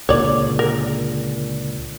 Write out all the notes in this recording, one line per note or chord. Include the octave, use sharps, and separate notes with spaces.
C#2 A#2 D3 C#5 D5
A#4